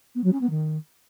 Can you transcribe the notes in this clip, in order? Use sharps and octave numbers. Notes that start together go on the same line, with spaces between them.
B3
F#3
C#4
B3
D#3